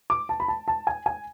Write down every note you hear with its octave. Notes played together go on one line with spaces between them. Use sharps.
D6
A5
B5
A5
A5
G#5
G#5